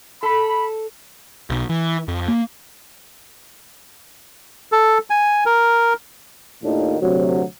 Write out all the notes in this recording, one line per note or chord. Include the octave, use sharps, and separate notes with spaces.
A4 B5
B1
E3
F2
A#3
A4
G#5
A#4
D#2 A2 D#3 D4 F4
D2 C3 F#3